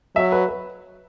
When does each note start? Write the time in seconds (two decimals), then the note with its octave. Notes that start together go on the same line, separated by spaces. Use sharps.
0.16 F#3 E5
0.32 B4
0.48 B4